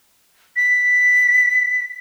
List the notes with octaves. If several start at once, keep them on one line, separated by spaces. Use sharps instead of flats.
B6